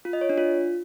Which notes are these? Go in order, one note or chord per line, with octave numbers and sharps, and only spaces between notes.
F4
D#5
C#5
D4
F4